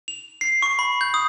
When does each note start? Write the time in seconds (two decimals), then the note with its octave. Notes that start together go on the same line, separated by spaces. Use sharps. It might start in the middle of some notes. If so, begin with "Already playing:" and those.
0.08 F7
0.41 C7
0.62 C#6
0.79 B5
1.01 G6
1.14 D#6